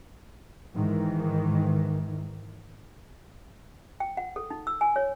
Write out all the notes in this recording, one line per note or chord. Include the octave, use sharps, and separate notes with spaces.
G#2 D#3 E3
G5
F#5
A4
D#4
E6
G#5
C#5